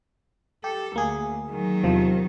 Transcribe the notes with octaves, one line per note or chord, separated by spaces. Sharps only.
G4 A4
D2 A#3 G#4
D#3 F#3
E2 C3 F3